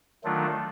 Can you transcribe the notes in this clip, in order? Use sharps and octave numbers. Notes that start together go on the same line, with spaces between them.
D#3 F#3 A3 D4 F4